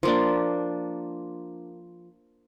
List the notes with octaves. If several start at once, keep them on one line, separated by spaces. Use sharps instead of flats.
F3 A#3 D4